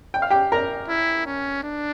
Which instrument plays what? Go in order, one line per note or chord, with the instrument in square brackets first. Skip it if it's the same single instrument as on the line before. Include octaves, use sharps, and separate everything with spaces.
[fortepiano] G5
F5
G4 G5
A#4 A#5
[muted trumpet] E4
C#4
D4